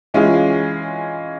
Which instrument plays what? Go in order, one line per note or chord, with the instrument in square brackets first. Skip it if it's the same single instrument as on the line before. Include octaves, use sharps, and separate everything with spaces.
[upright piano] E3 G#3 C#4 F4 G#4